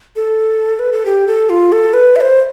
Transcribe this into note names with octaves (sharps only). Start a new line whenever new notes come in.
A4
B4
A4
G4
A4
F4
A4
B4
E5
C5